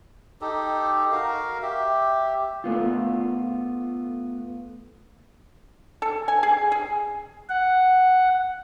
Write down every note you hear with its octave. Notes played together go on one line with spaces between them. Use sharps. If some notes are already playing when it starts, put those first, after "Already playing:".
D#4 G4 A4
F#4 A#4 F5
G4 E5
A3 B3 F4
A4
G#5
G#4
G#4
F#5